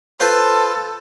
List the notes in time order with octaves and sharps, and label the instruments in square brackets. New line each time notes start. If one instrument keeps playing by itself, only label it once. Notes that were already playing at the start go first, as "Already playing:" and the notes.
[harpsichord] F4 B4 C5 [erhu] A4